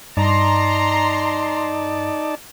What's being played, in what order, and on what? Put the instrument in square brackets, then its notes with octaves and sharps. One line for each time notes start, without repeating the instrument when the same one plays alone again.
[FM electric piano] G2 [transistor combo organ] D#4 D5 A5 [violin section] A#5 C6